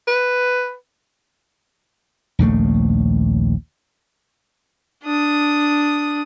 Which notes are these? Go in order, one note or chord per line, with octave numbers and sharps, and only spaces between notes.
B4
A#1 D#2 C#3 A3
D4 D#6